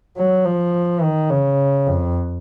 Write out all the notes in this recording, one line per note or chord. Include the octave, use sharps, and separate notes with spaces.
F#3
F3
D#3
C#3
F2